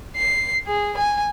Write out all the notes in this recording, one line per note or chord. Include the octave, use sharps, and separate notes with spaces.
C7
G#4
G#5